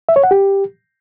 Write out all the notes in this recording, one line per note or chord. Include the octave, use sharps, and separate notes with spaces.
E5
C#5
F#5
G4